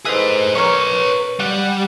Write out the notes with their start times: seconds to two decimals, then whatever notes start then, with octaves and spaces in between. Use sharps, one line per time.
0.05 G#4 A4 B4 C5 D#5
0.55 C#4 A#4 B4 C#5 C#6
1.40 G3 F#5